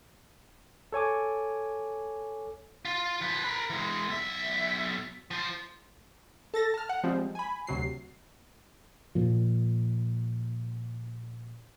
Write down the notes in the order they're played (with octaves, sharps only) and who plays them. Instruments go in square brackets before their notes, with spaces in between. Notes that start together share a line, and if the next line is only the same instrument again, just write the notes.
[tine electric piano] A4 C#5 G#5 D6
[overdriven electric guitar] F4
F3 B4
A#4 B5
E3 G#3
B1 E5
F3 C5
[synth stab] A4 A6 A#6
A5 F6
F#5
F3 G3 G#3 C4
G#5 B5
D2 C3 F#3 C7
[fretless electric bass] A#2 F3